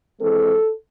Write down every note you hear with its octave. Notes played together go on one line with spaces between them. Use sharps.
E3 G#3 C4 A4